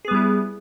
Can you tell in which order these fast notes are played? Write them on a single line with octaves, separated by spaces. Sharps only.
G#4 B3 G3 E4